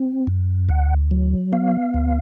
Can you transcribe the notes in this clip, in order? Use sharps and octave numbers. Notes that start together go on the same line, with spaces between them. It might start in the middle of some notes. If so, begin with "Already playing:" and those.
Already playing: C4
F#2
D2 F#5
F#3
B3 F5
D2